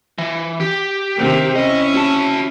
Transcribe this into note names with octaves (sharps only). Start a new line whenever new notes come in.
E3
G4
C3 D#3 A#4
C#4 E4 D#5
F#4 A5